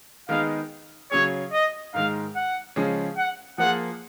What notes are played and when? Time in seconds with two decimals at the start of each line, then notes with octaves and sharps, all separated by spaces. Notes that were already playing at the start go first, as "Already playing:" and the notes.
0.29 D#3 G#3 B3 D#4 G#4 F5
1.11 C#3 F#3 C#4 G#4 C#5
1.53 D#5
1.94 G#2 D#3 G#3 F5
2.35 F#5
2.76 C#3 F3 G#3 C#4 G#4
3.17 F#5
3.58 F3 A#3 F4 G#4 F#5